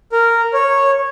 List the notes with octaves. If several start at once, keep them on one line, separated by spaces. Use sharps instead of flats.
A#4
C#5